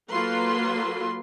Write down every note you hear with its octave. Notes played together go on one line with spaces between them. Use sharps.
F#3 A#3 F4 A4 B4 C6